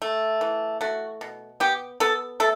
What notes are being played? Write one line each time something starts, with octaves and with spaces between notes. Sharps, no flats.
A3
E3
A3 F#4
B2
B3 G4
B3 A4
A3 A4